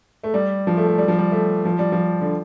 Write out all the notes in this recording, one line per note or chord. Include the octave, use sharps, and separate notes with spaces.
A3
G3
F3
A3
A3
G3
F3
G3
A3
F3
G3
F3
D3